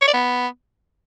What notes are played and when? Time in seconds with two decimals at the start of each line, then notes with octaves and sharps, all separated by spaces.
0.01 C#5
0.08 D5
0.14 B3